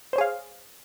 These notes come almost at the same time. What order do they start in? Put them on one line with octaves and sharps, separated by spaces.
C5 C#5 G#4 F5